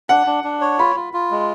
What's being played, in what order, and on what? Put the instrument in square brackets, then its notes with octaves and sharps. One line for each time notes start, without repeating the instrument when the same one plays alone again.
[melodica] D4 [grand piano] F#5
[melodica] D4
D4
C#5
[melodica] F4 [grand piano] B5
[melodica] F4
F4
G#3